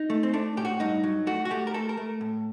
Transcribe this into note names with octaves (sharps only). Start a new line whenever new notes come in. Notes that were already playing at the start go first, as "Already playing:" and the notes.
Already playing: D#4
A3
C4
A3 D4
A2 G4
F#4
G2 D#4
F#3
A3 F#4
F#4
A3 G4
A#4
A3 A4
A#4
A3
A2